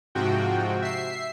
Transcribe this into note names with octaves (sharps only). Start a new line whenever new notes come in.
G#2 C3 F3 F#4 G5
E5 C7